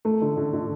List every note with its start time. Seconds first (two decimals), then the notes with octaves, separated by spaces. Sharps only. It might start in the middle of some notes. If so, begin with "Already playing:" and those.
0.05 A3
0.22 D3
0.37 D3
0.53 D3